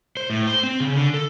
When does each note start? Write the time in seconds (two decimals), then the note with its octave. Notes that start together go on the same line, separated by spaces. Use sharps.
0.17 C5
0.30 A2
0.47 C5
0.63 C4
0.80 C#3
0.96 D3
1.14 A4